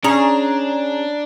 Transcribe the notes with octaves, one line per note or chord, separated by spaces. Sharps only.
C#4 D4 G#4 A#5